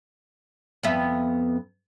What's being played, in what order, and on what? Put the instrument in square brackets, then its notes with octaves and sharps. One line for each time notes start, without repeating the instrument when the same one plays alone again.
[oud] F2 B3 E5